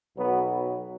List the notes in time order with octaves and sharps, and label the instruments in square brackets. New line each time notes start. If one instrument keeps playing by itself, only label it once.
[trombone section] B1 B2 F#3 B3